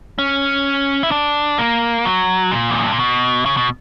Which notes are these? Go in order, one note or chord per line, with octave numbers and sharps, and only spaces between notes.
C#4
E4
D4
A#3
F#3
A#2
E2
F#2
G2
A#2
B2
C#3
B2